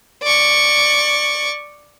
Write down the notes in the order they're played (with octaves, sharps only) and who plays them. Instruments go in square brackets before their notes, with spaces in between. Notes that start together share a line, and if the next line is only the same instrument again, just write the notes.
[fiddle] D5 C#6